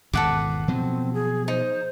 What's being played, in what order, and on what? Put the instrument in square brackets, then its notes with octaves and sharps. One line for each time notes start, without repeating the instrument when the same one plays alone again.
[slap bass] G#1 E2 B2 [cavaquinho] A4 F#5 D6
[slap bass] B2 F3 F#3 [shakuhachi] C4
[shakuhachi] G#4
[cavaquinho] D#4 [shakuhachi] C5